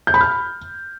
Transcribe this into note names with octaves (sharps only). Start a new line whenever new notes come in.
G6
B5
F6